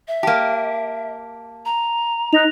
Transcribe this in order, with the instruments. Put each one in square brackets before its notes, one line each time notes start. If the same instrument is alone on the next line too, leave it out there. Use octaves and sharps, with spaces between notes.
[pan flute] E5
[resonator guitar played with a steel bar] A#3 G4 [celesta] A5
[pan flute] A#5
[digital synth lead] D#4 [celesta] F#6 A#6 F7